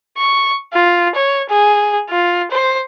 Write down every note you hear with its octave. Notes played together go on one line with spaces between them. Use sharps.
C#6
F4
C#5
G#4
F4
C5